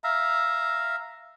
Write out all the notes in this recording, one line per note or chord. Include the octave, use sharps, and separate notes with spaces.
E5 F5 A#5